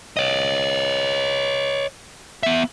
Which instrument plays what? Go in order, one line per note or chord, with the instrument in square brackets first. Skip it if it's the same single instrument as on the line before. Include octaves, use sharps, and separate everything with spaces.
[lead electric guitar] C#5 D#5
B3 E5